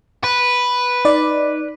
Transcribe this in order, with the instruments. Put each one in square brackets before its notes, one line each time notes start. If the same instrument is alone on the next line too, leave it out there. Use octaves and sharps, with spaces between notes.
[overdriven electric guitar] B4
[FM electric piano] D#4 D5